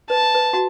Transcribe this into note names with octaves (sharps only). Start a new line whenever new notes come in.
B4 A5
B4
F#4